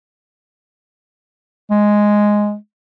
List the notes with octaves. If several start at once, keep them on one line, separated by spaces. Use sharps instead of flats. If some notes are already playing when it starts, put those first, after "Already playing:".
G#3